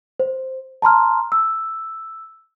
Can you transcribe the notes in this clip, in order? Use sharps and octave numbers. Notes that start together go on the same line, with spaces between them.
C5
A5 A#5 C6 F6
E6